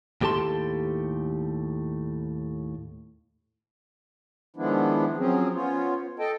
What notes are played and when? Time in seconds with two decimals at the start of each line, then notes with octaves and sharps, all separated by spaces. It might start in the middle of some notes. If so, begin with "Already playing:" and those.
0.21 D#2 A2 G4 A4 A5 C6
4.56 D#3 F3 G#3 B3 D4 E4
5.17 F3 F#3 C4 C#4 G#4
5.54 B3 C#4 F4 C5 C#5
6.19 A4 D#5 G5 A5